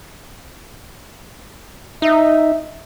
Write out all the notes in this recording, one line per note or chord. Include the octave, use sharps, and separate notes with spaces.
D#4 E5